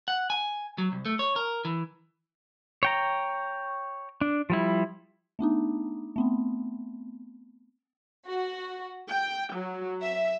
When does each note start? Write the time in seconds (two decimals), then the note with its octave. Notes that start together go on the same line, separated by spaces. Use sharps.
0.08 F#5
0.30 G#5
0.78 F#3
0.92 C2
1.05 A3
1.19 C#5
1.36 A#4
1.65 E3
2.83 C#5 G5 A#5
4.21 D4
4.50 F3 G3 E4
5.39 A3 B3 D4 D#4
6.16 A3 B3 C4
8.26 F#4
9.09 G5
9.55 F#3
10.03 E5